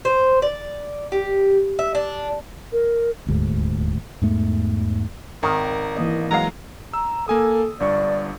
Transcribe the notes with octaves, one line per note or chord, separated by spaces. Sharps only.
C5
D5
G4
E5
D4
A#4
D#1 D2 G#2
E2 G#2 A3
G#1 D#3 A#4
E3 A#3 D#5
F#3 G#3 F5 A#5
A#5 E6
A#3 A4 G#5 D#6
G1 G2 D5 C#6